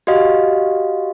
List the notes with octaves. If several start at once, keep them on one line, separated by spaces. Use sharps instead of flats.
F#4 G4 D#5 F5